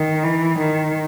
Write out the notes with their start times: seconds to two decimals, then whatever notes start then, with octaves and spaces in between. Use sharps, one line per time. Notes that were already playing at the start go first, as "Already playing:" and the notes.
Already playing: D#3
0.24 E3
0.59 D#3